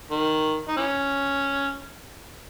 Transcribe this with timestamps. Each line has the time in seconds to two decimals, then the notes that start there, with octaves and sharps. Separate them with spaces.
0.11 D#3
0.68 D#4
0.77 E3 C#4